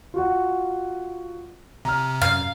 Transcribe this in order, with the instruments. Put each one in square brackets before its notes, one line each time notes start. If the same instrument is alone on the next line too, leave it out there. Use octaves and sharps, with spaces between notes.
[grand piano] F4 F#4 F#5
[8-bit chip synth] C3 [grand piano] A#5 F6
[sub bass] F#2 [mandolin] F5